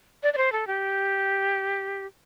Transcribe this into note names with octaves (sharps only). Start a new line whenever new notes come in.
D5
D5
C5
A4
G4